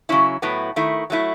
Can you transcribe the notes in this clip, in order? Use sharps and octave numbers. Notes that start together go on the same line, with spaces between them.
C#3 F#3 C#4 E4
A2 F#3 B3 E4
D#3 A3 E4
F#3 A3 E4